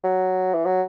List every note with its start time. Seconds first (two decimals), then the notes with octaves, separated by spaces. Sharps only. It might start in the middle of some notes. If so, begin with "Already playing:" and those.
0.04 F#3
0.54 E3
0.66 F#3